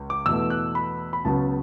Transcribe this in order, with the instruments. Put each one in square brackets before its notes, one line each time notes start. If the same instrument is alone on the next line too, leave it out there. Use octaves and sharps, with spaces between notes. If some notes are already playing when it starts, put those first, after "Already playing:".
Already playing: [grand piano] C#2
D6
E2 B2 A3 E6
F#6
B5
B5
C#2 C#3 F#3 B3 A5